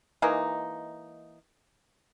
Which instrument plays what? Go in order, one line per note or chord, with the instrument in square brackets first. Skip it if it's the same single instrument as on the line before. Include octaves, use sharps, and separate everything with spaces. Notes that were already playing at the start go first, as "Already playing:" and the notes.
[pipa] E3 G#3 A#3 D#4